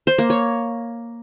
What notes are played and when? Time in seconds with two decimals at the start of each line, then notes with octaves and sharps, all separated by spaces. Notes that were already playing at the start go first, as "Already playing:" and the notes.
0.07 C5
0.18 A#3
0.30 C#5